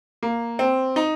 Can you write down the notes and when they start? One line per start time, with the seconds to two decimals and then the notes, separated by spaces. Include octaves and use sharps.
0.23 A#3
0.59 C4
0.96 D#4